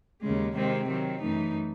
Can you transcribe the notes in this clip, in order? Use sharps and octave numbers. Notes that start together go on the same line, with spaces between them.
D#2 C#3 G#3
C3 D#3 G#3 C4
D#3 F#3 C4
F#2 E3 A3 D#4